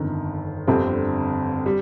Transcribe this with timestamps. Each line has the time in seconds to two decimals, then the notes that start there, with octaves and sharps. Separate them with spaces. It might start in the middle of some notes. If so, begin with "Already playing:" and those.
Already playing: G1 F2 D#3
0.67 G1 F2 D3 G3 C4
1.66 G3